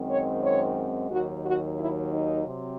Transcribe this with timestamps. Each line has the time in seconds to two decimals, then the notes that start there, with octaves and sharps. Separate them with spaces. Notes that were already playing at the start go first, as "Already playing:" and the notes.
Already playing: F#2 D#3 G#3 C4
0.09 C#5
0.42 C#5
1.10 D#2 D#3 F#3 F#4
1.44 F#4
1.78 E4
2.12 D#4
2.47 C3 F#3 C4